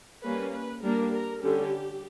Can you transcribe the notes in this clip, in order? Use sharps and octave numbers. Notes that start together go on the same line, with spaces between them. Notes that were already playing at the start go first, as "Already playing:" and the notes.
G3 A#3 C#4 B4
B4
G3 A#3 D4 A#4
A#4
D3 G3 C#4 G4